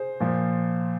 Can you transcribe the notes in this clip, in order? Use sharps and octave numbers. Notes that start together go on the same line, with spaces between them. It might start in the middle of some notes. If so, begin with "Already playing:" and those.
Already playing: G#4 C5
A#2 F3